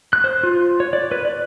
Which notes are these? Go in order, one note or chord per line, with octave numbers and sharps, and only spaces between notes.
F#6
C5
F4
C#5
D5
B4
D5